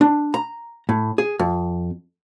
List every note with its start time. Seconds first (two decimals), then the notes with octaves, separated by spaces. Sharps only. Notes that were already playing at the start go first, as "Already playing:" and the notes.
0.01 D4
0.34 A#5
0.89 A2
1.18 G#4
1.39 F2